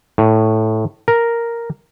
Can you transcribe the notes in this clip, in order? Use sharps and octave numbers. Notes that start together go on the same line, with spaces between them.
A2
A#4